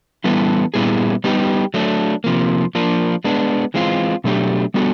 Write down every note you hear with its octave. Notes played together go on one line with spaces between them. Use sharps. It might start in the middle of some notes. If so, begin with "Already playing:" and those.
E3 G3 B3 E4 A4
A#2 G3 B3 E4 G#4
G3 B3 D#4 G4
F#3 A3 D4
C3 F3 A#3
F3 A#3 D4
G#3 B3 D4
E3 G#3 C4 F4
B2 F#3 A3 D4 G4
G3 B3 D4 F#4 A4